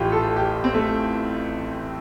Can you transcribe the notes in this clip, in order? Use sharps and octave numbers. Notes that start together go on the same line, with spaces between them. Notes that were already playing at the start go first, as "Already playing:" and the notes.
Already playing: A1 A2 F4 G4
A4
G4
C4
A3